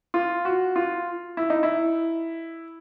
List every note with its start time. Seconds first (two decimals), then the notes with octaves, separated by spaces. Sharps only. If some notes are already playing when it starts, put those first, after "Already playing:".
0.14 F4
0.45 F#4
0.76 F4
1.37 E4
1.50 D#4
1.63 E4